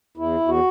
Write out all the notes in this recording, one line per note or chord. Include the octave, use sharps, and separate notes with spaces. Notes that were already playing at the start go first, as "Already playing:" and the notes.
E2 E4
E2
F#4